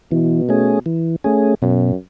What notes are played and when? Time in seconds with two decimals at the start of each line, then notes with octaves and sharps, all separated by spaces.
0.11 B2 E3
0.49 A3 C#4 G#4
0.86 E3
1.24 A3 C#4 G#4
1.62 F#2 B2